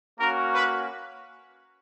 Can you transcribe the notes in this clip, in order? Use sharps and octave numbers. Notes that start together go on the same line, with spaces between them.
A#3 C#4 F#4 A#4
B4